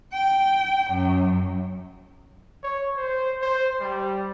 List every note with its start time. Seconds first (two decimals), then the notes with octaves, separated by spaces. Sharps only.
0.13 G5
0.91 F#2
2.63 C#5
2.97 C5
3.42 C5
3.81 G3